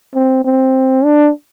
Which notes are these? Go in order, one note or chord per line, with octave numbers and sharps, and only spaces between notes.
C4
C4
D4